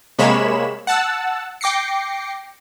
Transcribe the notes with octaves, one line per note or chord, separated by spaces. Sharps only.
C3 G#3 A#3 C#5 B5 E7
F#5 A5 E6
G5 D6 A#6 C7 C#7